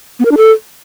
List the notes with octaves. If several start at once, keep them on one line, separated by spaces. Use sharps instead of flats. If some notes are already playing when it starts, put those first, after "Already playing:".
B3
A#4
D4
A4